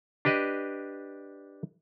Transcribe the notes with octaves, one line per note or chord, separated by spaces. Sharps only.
D4 G4 B4 D#5